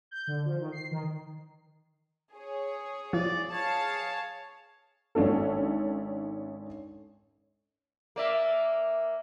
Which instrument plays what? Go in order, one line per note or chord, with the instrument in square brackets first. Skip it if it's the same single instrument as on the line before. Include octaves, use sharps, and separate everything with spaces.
[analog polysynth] G6
D3
F3
D#3
C7
D#3
[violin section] G#4 C#5
[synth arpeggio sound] F3 [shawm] D5
[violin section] G#4 F5 A5 [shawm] C#5
[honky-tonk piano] G#1 C#4 D4 A4
[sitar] A#3 D5 E5